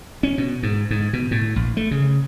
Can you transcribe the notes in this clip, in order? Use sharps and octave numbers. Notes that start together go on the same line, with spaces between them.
C#4
B2
G#2
G#2
B2
A2
A#1
A3
C#3